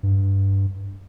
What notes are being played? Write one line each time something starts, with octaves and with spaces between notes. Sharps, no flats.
G2